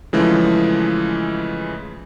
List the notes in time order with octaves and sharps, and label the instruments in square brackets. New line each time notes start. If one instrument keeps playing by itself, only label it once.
[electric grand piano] C#3 E3 F3 G#3 A3